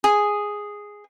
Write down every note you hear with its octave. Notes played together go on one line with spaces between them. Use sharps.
G#4